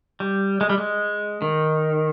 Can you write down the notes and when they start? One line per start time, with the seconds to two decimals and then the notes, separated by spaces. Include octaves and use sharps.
0.20 G3
0.61 G#3
0.69 G3
0.78 G#3
1.42 D#3